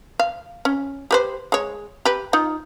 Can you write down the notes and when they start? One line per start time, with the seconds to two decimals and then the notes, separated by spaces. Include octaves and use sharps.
0.19 F5
0.65 C#4
1.11 G4 B4 C5
1.52 G#3 C#5
2.05 G4 B4
2.33 D#4 F4